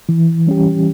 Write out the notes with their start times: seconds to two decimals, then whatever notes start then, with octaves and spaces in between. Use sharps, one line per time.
0.09 E3
0.47 G3 C#4 G4